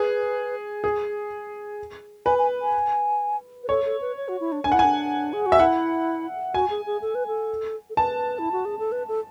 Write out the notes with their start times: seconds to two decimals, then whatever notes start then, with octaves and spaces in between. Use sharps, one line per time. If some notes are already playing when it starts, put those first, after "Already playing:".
Already playing: G#4 B4
0.84 G#4
2.26 B4 G#5
2.39 G#5
2.62 G#5
3.63 B4
3.69 A4 C#5
3.85 A4
4.01 B4
4.17 C#5
4.28 F#4
4.40 E4
4.52 D4
4.64 D4 G#5
4.72 E4 F#5
4.79 D4 G#5
5.33 G#4
5.46 F#4
5.52 E5
5.60 E4 F#5
6.54 F#4 G#5
6.70 G#4
6.86 G#4
7.02 A4
7.15 B4
7.27 A4
7.90 A4
7.97 B4 A5
8.39 E4
8.52 F#4
8.65 G#4
8.79 A4
8.92 B4
9.08 A4